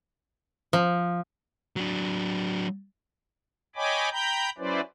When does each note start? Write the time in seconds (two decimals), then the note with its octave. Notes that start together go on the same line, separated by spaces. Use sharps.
0.73 F3
1.76 F#3 D4
3.76 C#5 D#5 G5 G#5 B5 D6
4.12 G5 A#5 B5 G6
4.58 F#3 C#4 E4 B4 C5 D5